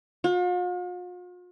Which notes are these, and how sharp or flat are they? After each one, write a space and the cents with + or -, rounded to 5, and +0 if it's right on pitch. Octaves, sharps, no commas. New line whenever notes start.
F4 +45